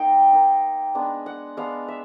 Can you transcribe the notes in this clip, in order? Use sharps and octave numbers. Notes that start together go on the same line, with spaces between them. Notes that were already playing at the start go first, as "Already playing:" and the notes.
Already playing: A#3 D#4 G5
A#3 D#4
G#3 B3 D4
F#5
G#3 B3 D4 F5
E5